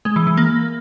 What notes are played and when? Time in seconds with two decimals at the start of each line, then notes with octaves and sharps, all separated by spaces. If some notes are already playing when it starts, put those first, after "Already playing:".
0.05 G#3
0.16 E3
0.27 E3
0.37 A#3